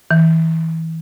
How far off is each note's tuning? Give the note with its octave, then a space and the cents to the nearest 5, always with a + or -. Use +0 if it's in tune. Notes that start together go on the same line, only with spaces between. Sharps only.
E3 -25